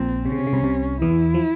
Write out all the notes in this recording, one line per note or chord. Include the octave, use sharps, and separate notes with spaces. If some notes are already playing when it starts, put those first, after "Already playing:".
Already playing: A#1 A#2 C4
C3 C#4
C#3
C3
C#3
C2 C3
C2 C3
E2 E3 E4
F3